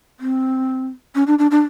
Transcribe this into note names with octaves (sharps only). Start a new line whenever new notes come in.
C4
C#4
D4
D4
D4